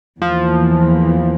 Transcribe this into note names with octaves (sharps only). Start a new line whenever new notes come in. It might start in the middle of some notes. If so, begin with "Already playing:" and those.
E2 E3 F3 A#3